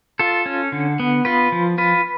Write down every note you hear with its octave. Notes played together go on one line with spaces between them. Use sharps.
F4 A4
C#4
D3
B3
F4 B4
F3
F4 B4